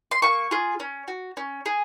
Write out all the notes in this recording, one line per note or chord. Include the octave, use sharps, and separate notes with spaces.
C6
A#3 C#6
F4 G#4
C#4
F#4
C#4
G#4